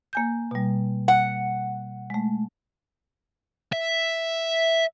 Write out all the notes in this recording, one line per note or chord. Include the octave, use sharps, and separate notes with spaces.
A#3 G#5 G6
B2 G3
F#5
G#3 A3
E5